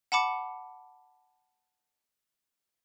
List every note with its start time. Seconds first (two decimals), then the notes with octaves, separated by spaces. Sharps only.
0.12 F#5 A5 B5 D6 C#7